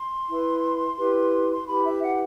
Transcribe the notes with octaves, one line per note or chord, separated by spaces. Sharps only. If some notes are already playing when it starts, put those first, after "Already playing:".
Already playing: C6
E4 B4
E4 G4 B4
C6
E4 G4 B4 B5
E5
F#5